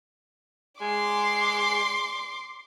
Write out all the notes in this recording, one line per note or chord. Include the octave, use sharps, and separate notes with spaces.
G#3 C6 D6